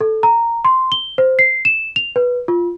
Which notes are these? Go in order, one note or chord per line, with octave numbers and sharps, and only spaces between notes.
A4
A#5
C6
G7
C5
C7
E7
F7
B4
F4